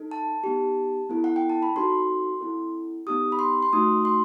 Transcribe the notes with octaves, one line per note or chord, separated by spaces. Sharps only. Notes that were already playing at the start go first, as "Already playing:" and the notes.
Already playing: D#4 A4
A5
B3 D#4 G4
B3 E4 A4
F#5
G5
A5
B5
C4 D#4 F#4 A4 C6
C4 E4 A4
B3 D#4 G4 D#6
B5
C6
C6
A3 D#4 F#4 D#6
C6